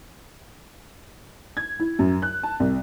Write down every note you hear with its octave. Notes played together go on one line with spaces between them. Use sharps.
G#6
E4
F#2
F#6
A5
C2